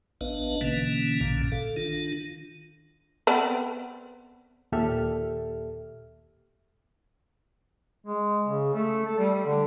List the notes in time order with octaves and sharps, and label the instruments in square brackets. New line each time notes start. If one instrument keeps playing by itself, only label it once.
[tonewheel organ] A1 B3 D4 B4 D#5 F5
B2 D3 E3 A#3 C#4
A#1 G2 A#2 D3
A4 F5
D#3 D4 F4
[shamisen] B3 C4 D5
[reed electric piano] D#2 A#2 G4 A4 E5 F6
[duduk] G#3
C#3
A3
A4
G3
D3